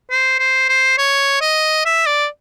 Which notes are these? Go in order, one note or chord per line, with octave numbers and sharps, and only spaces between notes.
C5
C5
C5
C#5
D#5
E5
D5